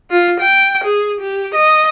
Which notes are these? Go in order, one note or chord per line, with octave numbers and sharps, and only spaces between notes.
F4
G5
G#4
G4
D#5